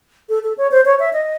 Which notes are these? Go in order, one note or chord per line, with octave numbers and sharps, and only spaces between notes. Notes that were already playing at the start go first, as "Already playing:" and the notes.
A4
A4
C#5
C5
C#5
E5
D#5